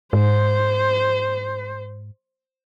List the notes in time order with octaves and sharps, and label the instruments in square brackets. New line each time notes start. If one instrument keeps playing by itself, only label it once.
[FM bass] G#2 [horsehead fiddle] C5